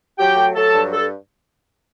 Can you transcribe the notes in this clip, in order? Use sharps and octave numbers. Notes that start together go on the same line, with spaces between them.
F#3 G4 G5
A3
F#3 A4 A5
G2
A4